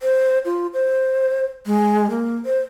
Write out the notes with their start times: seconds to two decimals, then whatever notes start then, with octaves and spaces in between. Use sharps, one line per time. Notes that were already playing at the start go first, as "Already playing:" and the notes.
0.01 C5
0.45 F4
0.73 C5
1.66 G#3
2.10 A#3
2.45 C5